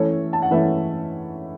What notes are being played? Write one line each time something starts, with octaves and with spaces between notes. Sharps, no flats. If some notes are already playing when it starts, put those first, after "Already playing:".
Already playing: E3 A3 C#4 A4 C#5
A5
F#5
E3 A3 C#4 B4 E5